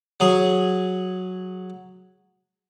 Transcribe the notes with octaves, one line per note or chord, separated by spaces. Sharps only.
F#3 G#4